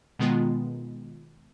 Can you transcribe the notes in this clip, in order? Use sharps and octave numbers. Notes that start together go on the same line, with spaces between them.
B2 D#3 G#3 B3 F4